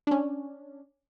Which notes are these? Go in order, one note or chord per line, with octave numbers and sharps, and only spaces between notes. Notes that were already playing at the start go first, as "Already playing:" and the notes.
C#4 D4